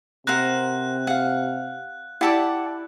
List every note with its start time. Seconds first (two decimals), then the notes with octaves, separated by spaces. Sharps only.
0.27 C3 A#4 C5 F#5 F#6
1.07 F5 F#5
2.21 E4 G4 D5 F#5 A5 D6